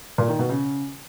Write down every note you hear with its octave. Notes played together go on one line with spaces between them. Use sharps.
A#2
D#3
B2
C#3